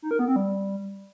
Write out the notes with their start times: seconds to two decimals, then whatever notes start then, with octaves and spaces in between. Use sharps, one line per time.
0.02 D#4
0.11 A#4
0.19 B3
0.28 C4
0.36 G3